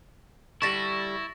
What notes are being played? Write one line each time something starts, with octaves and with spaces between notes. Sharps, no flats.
D3 G3 E4 C#6 A6 A#6